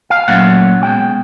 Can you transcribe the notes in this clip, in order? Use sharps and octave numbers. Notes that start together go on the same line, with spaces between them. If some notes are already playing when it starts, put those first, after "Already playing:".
F5
A#2 F#3 A3 C#4 F#5
B2 G#3 C#4 G5